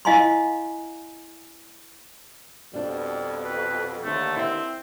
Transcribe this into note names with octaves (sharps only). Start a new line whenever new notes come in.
E4 D#5 F5 G#5 A#5 C6
F2 B2 G3 D4
B4
D#2 D3 A3
C4 E4